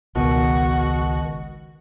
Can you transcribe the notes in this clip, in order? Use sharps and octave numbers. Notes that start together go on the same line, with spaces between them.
G#1 C#2 B2 D#3 F#4